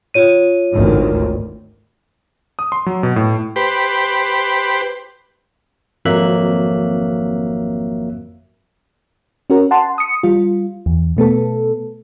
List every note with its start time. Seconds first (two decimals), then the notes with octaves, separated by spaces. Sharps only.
0.14 F4 C#5 D#7
0.73 G#1 D2 D#3
2.59 D#6
2.72 C6
2.86 F#3
3.03 B2
3.16 A2
3.56 G4 B4 C5
6.05 G#1 F2 F#3 A#3 E5 F#6
9.50 C#4 F#4 A#4
9.71 F#5 A5 C6
9.98 D#6 C#7
10.23 G3 F4
10.86 E2
11.17 B2 A3 B3 A4